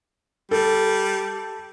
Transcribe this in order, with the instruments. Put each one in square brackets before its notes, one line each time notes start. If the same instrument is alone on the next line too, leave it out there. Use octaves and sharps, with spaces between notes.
[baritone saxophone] G3 [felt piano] A4